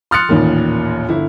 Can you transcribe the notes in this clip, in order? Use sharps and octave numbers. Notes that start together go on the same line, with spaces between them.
C6 D#6 F6 F#6 A6 C#7
A1 D#2 A#2 D#3
G1 E4